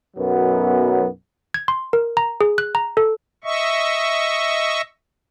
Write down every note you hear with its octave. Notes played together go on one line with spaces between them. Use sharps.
B1 F#2 F#3 B3
G#6
C6
A#4
A#5
G#4
F#6
A#5
A4
D#5 E5 C#6